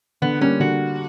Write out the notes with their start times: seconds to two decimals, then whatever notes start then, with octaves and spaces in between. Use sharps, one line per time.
0.22 D3 B3
0.41 G3 A#3 C#4
0.60 D3 F#4